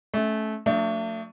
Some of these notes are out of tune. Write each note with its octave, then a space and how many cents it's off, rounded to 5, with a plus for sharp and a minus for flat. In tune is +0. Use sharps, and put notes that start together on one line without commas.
A3 -20 C#4 +0
F#3 -45 A3 +35 D4 +0